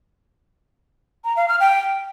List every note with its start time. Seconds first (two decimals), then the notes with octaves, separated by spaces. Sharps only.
1.25 A#5
1.36 F5
1.48 F6
1.60 G5